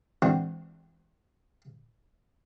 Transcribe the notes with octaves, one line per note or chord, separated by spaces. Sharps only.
E3 G#3 C4 D4 F#4 G4